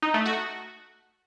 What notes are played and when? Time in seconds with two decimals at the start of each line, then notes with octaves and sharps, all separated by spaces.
0.02 D#4
0.14 A3
0.26 F#4